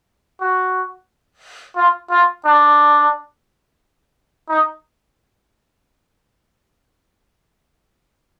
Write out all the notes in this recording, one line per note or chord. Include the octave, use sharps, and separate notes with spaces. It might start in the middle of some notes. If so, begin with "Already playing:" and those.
F#4
F4
F4
D4
D#4